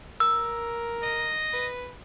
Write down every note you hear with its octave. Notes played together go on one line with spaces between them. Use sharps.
A#4 E6
D#5
B4